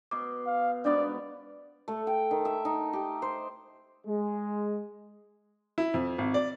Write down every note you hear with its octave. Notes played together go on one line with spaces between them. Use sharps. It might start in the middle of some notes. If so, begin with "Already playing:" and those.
B2 C6 D6
F5
G#2 B2 B3 D4 D5
A3
G5
D#3
E5
D#4
G4
C5
G#3
E4
F2
G#1
D5